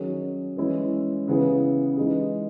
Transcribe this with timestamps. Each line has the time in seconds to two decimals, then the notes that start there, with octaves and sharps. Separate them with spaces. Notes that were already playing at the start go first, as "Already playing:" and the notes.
Already playing: D#3 F#3 C#4 G#4
0.56 E3 G#3 C#4 E4
1.28 C#3 E3 B3 E4 G#4
1.97 E3 G#3 D#4 G#4